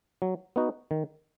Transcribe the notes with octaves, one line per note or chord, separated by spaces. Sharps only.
F#3
B3 D#4 F#4
D#3